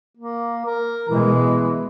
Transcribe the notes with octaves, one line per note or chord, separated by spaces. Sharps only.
A#3
A#4
B2 E3 G#3